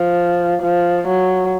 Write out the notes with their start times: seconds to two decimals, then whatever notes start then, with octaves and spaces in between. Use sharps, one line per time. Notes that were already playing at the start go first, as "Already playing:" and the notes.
Already playing: F3
0.62 F3
1.07 F#3